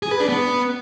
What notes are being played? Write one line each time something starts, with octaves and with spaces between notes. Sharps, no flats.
G#4
B4
D4
B3